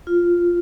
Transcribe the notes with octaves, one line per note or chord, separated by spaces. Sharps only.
F4